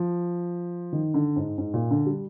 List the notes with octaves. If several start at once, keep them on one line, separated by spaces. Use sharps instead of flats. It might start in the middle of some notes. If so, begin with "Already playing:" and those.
Already playing: F3
D#3
D3
G#2
G#2
A#2
D3
G3